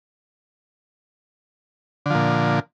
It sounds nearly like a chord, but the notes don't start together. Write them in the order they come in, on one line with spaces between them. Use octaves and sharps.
D3 F3 A#2